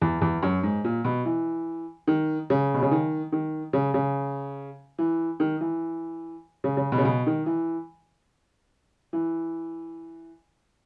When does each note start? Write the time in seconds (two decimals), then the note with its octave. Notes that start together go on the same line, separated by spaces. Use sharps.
0.01 E2
0.21 E2
0.43 F#2
0.63 G#2
0.84 A#2
1.04 B2
1.25 E3
2.07 D#3
2.50 C#3
2.74 B2
2.82 C#3
2.91 D#3
3.32 D#3
3.73 C#3
3.94 C#3
4.99 E3
5.40 D#3
5.61 E3
6.64 C#3
6.77 C#3
6.92 B2
6.98 C#3
7.05 B2
7.27 D#3
7.46 E3
9.13 E3